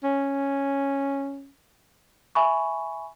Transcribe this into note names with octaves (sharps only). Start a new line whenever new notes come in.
C#4
E5 G#5 B5 C#6